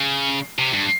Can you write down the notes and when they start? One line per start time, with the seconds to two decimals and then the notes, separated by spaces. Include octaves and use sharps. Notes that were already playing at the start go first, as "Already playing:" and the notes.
Already playing: C#3
0.59 C3
0.74 G2